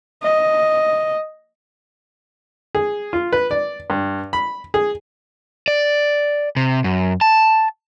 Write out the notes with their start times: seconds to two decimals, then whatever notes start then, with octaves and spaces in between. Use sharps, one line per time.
0.23 D#5
2.75 G#4
3.13 F4
3.33 B4
3.51 D5
3.90 G2
4.33 B5
4.74 G#4
5.68 D5
6.56 C3
6.84 F#2
7.21 A5